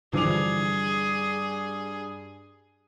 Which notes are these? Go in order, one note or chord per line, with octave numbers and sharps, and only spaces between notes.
G2 D3 E3 F3 G#4 D6 F7